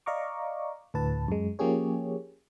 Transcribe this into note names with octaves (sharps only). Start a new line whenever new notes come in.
D5 D#5 F5 A#5 C#6 D6
D2 A2 B4 A5
F#2 G#3
F3 A#3 C#4 G4 G#4 C#5